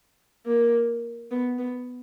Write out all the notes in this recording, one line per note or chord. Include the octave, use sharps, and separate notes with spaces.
A#3
B3
B3